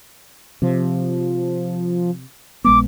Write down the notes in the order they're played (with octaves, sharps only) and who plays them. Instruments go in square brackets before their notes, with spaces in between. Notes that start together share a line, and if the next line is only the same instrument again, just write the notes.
[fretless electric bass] C3 [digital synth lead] F3
[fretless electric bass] A#1 G#3 B3 [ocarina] D6